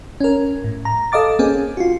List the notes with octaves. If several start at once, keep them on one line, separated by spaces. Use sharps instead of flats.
C#4 A#4
A2
A#5
A4 D#5 F5 D6 A6
A#3 C4 C#4 G#4
F4 F#4